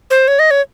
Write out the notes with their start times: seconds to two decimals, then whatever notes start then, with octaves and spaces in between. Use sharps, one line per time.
0.10 C5
0.28 C#5
0.39 D#5
0.51 C#5